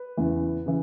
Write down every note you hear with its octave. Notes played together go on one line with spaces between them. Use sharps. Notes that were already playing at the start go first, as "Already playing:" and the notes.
Already playing: B4
E2 C#3 E3
C#3 E3